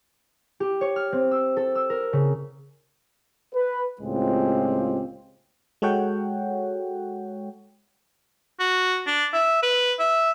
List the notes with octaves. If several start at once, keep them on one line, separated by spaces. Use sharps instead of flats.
G4
C#5
F6
C4
E6
A4
E6
A#4
C#3
B4
C#2 A2 G#3 C4 F4 G4
G#3 F#4 A4 C#5 F#5 G5
F#4
D4
E5
B4
E5